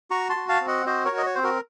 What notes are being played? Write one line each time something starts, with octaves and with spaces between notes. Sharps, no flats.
F#4 A#5 C#6
A5 C6
F#4
F5 A5
C4
D#5 F#5
F#4 C5 D#5
A#4 C#5
F#4
D#5
C#5
C4 C5
F#4 A#4